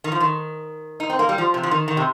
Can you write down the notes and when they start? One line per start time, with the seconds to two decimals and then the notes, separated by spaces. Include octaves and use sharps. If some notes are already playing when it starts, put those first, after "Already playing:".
0.04 D#3
0.12 F3
0.20 D#3
1.00 D#4
1.10 C4
1.19 A#3
1.29 G3
1.38 F3
1.54 C3
1.63 F3
1.71 D#3
1.88 D#3
1.97 C3